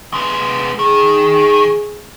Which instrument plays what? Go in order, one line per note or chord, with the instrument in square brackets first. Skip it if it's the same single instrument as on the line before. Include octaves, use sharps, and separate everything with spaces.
[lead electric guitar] G#3 B3
[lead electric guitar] D#3 [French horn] G#4